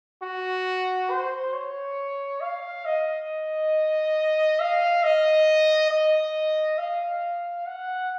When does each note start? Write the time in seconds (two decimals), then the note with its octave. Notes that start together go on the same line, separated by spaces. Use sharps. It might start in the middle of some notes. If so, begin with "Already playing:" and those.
0.22 F#4
1.10 C5
1.53 C#5
2.41 F5
2.85 D#5
4.60 F5
5.03 D#5
5.90 D#5
6.78 F5
7.66 F#5